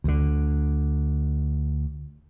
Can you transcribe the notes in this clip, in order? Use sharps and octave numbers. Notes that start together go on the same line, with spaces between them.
D2 D3